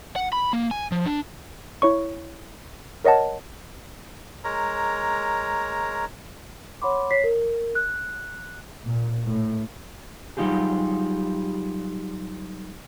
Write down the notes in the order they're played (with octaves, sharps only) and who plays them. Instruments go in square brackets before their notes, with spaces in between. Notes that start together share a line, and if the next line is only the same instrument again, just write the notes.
[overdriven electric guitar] F#5
B5
A#3
G#5
F3
D4
[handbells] E4 C#5 C#6
A#4 C#5 D#5 F#5 A5
[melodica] G#3 A#4 C#5 A#5
[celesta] C#5 F#5 B5 C6 D6
C#5 B6 C7
A#4
F#6
[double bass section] A#2
A2
[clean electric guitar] F#3 G3 D#4 F4 G4 G#4